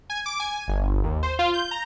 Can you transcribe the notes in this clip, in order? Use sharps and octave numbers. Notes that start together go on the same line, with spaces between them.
G#5
D6
G#5
G1
D#2
C5
F4
G6
A#5